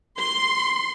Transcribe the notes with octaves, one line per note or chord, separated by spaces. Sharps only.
C6